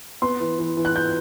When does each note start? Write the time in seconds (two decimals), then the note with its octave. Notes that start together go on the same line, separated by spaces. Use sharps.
0.22 B3 C6
0.40 E3
0.59 E3
0.77 E3
0.85 F#6
0.96 G6